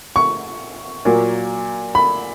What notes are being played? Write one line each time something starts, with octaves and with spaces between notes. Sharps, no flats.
C#6
A#2 F#3 A#3
B5